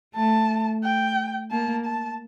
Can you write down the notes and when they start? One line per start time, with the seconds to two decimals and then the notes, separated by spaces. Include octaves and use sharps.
0.15 A3 A5
0.83 G5
1.51 A#3 A5
1.85 A5